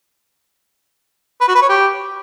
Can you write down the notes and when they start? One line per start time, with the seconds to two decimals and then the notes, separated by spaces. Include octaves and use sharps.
1.41 B4
1.48 F#4
1.55 B4
1.62 C#5
1.69 G4